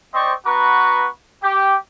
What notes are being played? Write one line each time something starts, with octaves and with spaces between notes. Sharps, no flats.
C4 C5 D5 D#5 C#6
B3 F#4 B4 A#5 C#6
G4